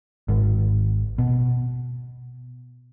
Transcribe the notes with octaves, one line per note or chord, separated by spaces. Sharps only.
G#1
B2